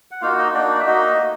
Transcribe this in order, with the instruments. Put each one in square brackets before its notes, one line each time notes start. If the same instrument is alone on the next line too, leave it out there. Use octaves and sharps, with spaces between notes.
[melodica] F#5
A#3 D#4 F4 F#4 F5
D#4 D#5
A#3 D4 D#4 F#4 D5
E5
A#3 D#4 F#4 D#5
A3